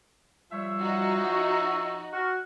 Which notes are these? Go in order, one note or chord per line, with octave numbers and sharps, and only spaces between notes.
F3 G3 C#5 E5
D#4 F#4
C#6
F#4 F6